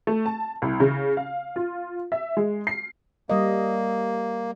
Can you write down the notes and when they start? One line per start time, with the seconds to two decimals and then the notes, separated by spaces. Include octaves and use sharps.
0.07 A3
0.26 A5
0.62 C2
0.80 C#3
1.17 F5
1.56 F4
2.12 E5
2.37 G#3
2.67 C7
3.30 G3 A#3 D#5